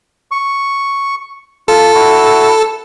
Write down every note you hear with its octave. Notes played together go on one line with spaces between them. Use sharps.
C#6
F4 A4
E4 F#4